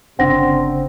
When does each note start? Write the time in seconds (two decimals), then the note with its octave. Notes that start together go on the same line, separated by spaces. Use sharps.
0.19 G1 C#3 C4 D4 F#5 A#6